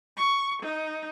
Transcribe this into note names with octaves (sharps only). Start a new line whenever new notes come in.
C#6
D#4